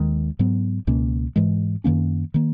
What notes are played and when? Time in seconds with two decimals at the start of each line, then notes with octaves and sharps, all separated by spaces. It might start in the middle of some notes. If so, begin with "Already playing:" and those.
Already playing: D#2 D#3 G#3
0.39 G#2 F#3 B3
0.87 C#2 B2 A#3 C#4
1.36 G#2 E3 G#3
1.84 F#2 D#3 A#3 C#4
2.34 D#3 A#3